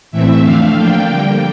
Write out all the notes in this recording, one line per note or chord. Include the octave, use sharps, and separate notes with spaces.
A2 E3 A3 C4 E5
F2 D3 A3 D4 F5
D3 F3 A#3 D4 G5
D3 G3 A#3